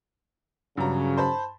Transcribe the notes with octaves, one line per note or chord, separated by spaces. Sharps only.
G2 C#3 F#3 A#5
C5 A5 B5